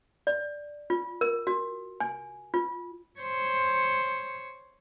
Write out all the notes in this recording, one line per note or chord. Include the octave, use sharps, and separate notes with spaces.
D5
F4
A#4
F#4
G#5
F4
C5 C#5